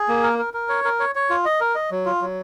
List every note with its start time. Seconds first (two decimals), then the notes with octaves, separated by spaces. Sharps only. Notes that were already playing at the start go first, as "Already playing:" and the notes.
Already playing: G#4
0.09 A#3
0.23 A#4
0.38 A#4
0.54 A#4
0.69 C#5
0.84 A#4
1.00 C#5
1.15 C#5
1.30 F4
1.45 D#5
1.61 A#4
1.75 D#5
1.91 F#3
2.06 F4
2.21 F#3